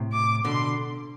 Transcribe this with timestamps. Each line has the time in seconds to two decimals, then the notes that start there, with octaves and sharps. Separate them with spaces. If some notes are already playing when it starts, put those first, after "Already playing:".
Already playing: A2 C3
0.13 D6
0.45 B2 D3 C6